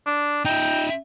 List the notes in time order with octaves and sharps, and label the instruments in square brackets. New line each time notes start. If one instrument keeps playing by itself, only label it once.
[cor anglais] D4
[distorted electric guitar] D#4 E5 [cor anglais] G5